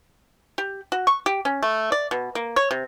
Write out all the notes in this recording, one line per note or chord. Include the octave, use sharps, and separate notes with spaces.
G4
F#4
C#6
G4
C#4
A3
D5
B2
A#3
C#5
C3